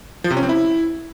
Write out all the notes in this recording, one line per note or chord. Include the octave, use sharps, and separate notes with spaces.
F3
C3
C#4
C4
E4